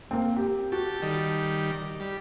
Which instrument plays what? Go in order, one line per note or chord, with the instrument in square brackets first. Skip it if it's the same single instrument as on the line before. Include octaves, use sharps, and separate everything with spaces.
[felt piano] A#3 C4
G4
[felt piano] F#4 [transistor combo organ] G4 A4
[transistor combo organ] D#3 G3
G3